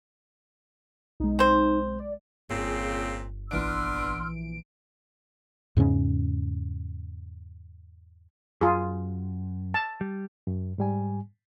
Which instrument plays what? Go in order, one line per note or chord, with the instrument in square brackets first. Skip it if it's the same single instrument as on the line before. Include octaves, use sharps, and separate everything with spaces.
[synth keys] B1 G#3 [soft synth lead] D#4
[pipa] C4 C5
[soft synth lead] D5
[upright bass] G1 [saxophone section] A#2 C#3 C4 [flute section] G#4
[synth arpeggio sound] A#1 E3 D7 [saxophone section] B3 D4 [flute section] C6 E6 F6
[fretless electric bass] E2 G#2 C#3 C#4
[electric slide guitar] F#2 [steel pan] F4 G#4
[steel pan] A5
[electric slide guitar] G3
[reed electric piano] F#2
G#2 G3 G#5